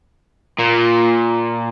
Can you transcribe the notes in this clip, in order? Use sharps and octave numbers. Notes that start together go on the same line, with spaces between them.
A#2